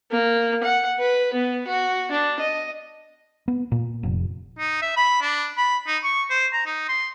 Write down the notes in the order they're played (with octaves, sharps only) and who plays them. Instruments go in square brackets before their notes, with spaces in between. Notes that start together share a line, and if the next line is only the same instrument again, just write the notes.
[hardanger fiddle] A#3
F#5
B4
B3
F#4
D4
D#5
[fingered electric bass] B3
A#2
F1
[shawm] D#4
E5
B5
D4
B5
D#4
C#6
C5
A#5
D#4
C6